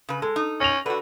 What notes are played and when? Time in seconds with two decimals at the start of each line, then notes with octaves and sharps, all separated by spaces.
0.09 C#3 B4
0.22 G#3 A4
0.36 D#4
0.60 C#4 A#6 F7
0.86 D3 F#4 A4 B4